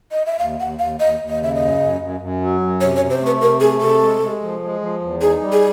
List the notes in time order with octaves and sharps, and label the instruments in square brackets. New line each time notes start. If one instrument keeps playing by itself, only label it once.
[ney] D#5
E5
[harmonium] D#2 [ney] F5
[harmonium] D#2 [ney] F#5
[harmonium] D#2 [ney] F5
[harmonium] D#2 [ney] D#5
[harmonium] D#2
[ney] D#5
[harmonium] C#3 [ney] E5
[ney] D#5
[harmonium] F#2
F#2
F#2
F#2
F#3
F#2
[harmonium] C3 [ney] C#5
[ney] C#5
[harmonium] C3
[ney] C5
[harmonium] A3
[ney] B4
[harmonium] C3 [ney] A#4
[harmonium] A3 [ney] G#4
[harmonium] C3 [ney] A4
[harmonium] G#3
G#3
F3
G#3
F3
E2
[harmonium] D#4 [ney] G#4
[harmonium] G3
[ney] G#4